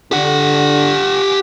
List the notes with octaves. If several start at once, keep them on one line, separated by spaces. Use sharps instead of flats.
D3 G4 F#5